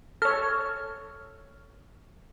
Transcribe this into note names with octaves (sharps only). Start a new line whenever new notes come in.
A4 C#5 F6